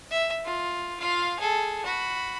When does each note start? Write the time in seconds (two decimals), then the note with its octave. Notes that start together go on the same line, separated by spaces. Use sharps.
0.11 E5
0.45 F4
1.00 F4 F5
1.39 G#4 A4
1.85 F#4 B5